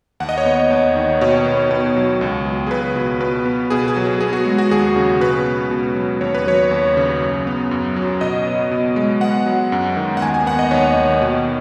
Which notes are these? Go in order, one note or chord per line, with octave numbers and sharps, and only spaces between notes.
D#2 F#5
D#5
C#5
B3 D#5
D#2
D#3
B2 C#5
B3
B2
F#3
C#2
F#3
G#4
C#2 B4
B2
B2 B4
B3
B2 G#4
G#4
F#3
G#4
B3 G#4
F#4
G#3
F#4
D#2 G#4
C#3
B2 B4
B3
B2
F#3
D#2 C#5
B4
F#3 C#5
D#2
C#3
F#2
B3
F#2
F#3
B2 D#5
B3
B2
G#3
B3 F#5
F#3
F#2
D#3
F#5
D#2 G#5
G#5
B3 F#5
D#5
D#2 C#5
D#3
B2